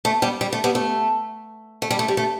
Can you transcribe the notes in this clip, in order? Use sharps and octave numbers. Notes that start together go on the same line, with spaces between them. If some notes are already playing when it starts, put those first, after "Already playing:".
A3
G3 B3
G3
A3
G3 B3
A3
A3
G3
A3
G3
A3